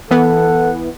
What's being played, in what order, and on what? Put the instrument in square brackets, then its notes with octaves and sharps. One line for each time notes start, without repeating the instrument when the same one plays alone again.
[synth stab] E3 B3 [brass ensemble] A4 F#5